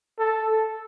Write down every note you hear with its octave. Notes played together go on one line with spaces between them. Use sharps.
A4